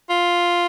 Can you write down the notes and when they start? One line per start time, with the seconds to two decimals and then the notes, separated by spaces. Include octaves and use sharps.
0.10 F4